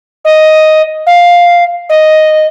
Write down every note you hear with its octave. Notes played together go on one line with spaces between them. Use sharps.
D#5
F5
D#5